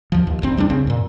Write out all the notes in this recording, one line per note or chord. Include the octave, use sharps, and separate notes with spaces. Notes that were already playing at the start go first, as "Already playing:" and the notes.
D#2 F3
D#2
F1 C2 C4
E2 G3 B3 D4
C2 C#3 C4
F#2 A#2